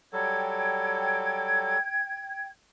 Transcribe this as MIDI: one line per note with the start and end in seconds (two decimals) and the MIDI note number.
0.13 1.78 54
0.13 1.78 55
0.13 1.78 69
0.13 2.47 79
0.13 2.47 92